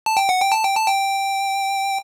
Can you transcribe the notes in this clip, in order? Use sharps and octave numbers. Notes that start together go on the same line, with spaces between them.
A5
G5
F#5
G5
A5
G5
A5
G5